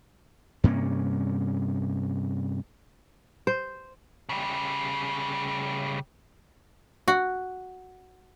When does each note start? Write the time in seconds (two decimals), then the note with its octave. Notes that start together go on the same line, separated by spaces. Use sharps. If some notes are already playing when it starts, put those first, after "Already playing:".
0.64 G2 C3 A#3 C#4
3.47 C5
4.29 C#3 G3
7.08 F#4